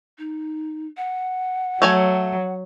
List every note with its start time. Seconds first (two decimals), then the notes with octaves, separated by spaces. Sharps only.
0.18 D#4
0.97 F#5
1.82 F#3 A3 C#5 G#5